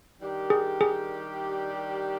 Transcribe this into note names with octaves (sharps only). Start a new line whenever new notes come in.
D#3 G3 D4 G4 A#4
G#4
G#4